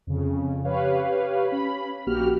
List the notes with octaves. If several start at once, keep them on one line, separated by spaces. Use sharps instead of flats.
F2 C#3
G4 B4 C#5 F5
C#4 B5
A#1 A#3 F#4 G4 F6